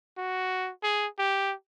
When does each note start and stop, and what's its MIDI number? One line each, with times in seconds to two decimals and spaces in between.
0.18 0.70 66
0.83 1.07 68
1.19 1.53 67